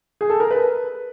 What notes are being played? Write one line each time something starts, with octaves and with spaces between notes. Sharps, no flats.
G#4
A4
A#4
B4